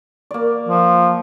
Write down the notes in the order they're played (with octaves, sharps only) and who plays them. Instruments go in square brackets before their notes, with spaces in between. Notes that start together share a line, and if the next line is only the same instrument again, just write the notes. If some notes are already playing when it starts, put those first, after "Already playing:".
[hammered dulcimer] A#3 D5
[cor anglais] F3